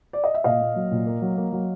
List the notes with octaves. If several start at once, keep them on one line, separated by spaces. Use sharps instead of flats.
D5
D#5
E5
A#2 D#5 F5
A#3
F#3
A#2
A#3
F#3
A#3
F#3